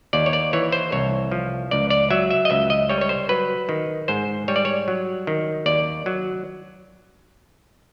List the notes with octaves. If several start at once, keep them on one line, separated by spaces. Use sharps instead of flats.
D#2 D5
C#5
D5
E3 C#5
C5
C2 C#5
F3
C#2 D5
D5
F#3 E5
E5
D#5
C#2 E5
D#5
G3 C#5
C#5
C5
F#3 B4
D#3
G#2 C5
G3 C#5
D5
C#5
F#3
D#3
D#2 D5
F#3